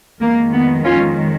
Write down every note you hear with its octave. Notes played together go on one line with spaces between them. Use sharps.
F2 D#3 G#3 A#3
B3
C#4 F4